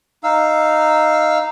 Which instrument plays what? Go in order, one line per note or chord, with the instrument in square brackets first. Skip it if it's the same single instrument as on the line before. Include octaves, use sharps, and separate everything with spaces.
[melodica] D#4 F5 E6